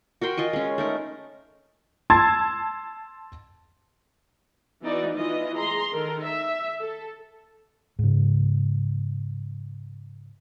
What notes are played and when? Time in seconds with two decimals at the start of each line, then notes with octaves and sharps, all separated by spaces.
0.21 F#4 A#4 G5 C6
0.37 F4 D#5 G#5 C#6
0.53 G#3 C#4
0.78 A3 D#4 A#4
2.10 A5 C6 E6 G#6 A6
4.83 E3 B3 D#4 F#4 D5
5.16 E3 F4 D#5
5.56 G#4 A#5 C6
5.92 D#3 A4 A#4
6.25 E5
6.80 A4
7.99 G#2 C#3